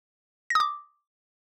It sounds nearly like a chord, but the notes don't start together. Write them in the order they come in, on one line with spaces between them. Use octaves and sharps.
A#6 D#6 D6